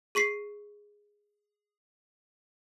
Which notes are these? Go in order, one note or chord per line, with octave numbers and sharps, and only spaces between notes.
G#4 C#6 B6 C7